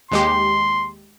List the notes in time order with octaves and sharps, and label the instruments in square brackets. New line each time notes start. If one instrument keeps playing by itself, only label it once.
[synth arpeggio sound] D#2 G#3 G4 [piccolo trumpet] C6